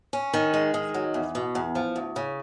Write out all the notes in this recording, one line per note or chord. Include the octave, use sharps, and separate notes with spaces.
C#4
D#3
G#3
D#3
F#3
E2
B2
E2
F3
D2
C#3